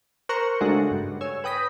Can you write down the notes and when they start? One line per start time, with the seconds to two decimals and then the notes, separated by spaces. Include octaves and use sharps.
0.29 A#4 C5 A#5 C#6 F#6
0.61 C#3 G#3 A3 D4 F#4 G#4
0.91 G2
1.21 C#5 G#5 E6
1.44 B4 G5 D#6 A#6 B6